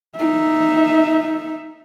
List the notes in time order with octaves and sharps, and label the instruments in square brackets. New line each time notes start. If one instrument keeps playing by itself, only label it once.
[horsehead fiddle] D#4 E5